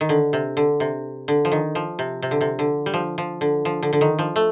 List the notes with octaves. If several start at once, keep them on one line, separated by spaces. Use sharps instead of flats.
D#3
D3
C3
D3
C3
D3
F3
D#3
F3
C3
C3
D3
C3
D3
G3
F3
F3
D3
F3
D3
D3
D#3
F3
A3